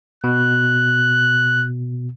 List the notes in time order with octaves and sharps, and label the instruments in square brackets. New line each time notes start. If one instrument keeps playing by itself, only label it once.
[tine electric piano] B2 [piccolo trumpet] F#6